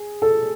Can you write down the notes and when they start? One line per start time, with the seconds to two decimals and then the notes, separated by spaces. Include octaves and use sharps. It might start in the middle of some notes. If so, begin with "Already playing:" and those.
Already playing: G#4
0.22 A4